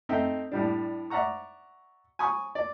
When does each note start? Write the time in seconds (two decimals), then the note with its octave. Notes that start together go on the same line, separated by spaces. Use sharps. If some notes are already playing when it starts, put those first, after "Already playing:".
0.09 A3 C4 D#4 E5 G5
0.52 A2 G3 D4
1.10 D5 E5 F#5 A#5 C#6
2.19 G#5 B5 C#6 D#6
2.55 D5